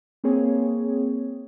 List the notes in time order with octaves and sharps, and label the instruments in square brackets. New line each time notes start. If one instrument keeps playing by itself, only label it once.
[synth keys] A#3 C4 G#4 C#5